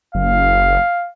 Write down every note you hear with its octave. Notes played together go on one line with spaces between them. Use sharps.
F#1 F5